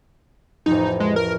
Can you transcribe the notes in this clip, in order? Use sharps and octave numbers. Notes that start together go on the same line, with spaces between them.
A1 F2 D#4
G#3
A#4